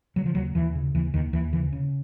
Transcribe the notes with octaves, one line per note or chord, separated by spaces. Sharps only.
C#3 F#3
F3
D#2 F#3
D#2 E3
C#3
D#2 E3
D#2 D#3
D#2 E3
C#3 E3
C#3